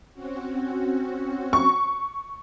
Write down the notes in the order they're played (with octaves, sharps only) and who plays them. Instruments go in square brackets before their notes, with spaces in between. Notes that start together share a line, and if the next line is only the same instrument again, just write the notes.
[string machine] C4 C#4 F#4
[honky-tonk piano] C#6